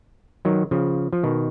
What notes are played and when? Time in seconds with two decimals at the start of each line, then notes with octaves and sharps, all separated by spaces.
0.45 D#3 F#3
0.71 C#3 F3
1.13 F3
1.23 B2 D#3